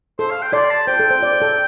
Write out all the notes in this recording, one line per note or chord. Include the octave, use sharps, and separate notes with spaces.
A4 C5
F5
G5
A4 D5 C6
A5
C5 G5
A4
C5
D5
C5
A4 D5